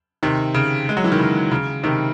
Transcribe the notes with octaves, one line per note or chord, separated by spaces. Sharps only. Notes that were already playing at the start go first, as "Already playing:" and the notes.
C3 D#3
C#3
G#3
F#3
E3
D#3
C#3
C#3
C3 D#3